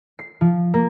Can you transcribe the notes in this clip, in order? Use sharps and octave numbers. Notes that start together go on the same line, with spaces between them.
C7
F3
A#3